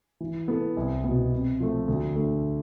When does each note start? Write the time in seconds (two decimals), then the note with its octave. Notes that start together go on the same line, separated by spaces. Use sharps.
0.20 E3
0.48 B3 E4 A4
0.77 C2
1.04 B2 B3
1.32 C3
1.60 F3 A3
1.88 D2
2.16 D3 A3